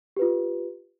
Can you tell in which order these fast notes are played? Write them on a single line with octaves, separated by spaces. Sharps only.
G4 B4 F4